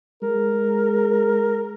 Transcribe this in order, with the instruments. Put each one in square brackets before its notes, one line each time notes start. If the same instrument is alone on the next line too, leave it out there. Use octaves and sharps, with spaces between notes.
[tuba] G#3 [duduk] A#4